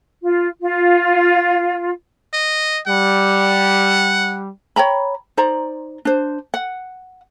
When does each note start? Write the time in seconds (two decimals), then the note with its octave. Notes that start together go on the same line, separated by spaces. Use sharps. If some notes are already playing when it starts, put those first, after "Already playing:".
0.22 F4
0.62 F4
2.33 D#5
2.87 G3 F#5
4.76 C#5 G5 A#5 B5
5.37 D#4 C5 D5 A#5
6.05 D4 C5
6.54 F#5